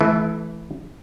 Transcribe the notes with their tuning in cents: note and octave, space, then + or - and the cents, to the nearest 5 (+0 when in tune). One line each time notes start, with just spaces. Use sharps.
E3 +0 A3 -30